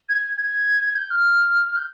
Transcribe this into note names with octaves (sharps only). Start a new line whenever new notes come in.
G#6
G#6
G6
F6
G6